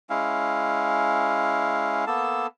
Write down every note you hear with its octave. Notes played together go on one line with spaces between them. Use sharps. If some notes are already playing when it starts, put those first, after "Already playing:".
G#3 C#4 E4 F5
A#3 B3 A4 A5